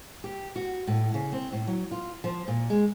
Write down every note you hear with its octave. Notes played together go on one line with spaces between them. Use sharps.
G4
F#4
A2
C#3
C4
A2
F#3
F4
F3
A#2
G#3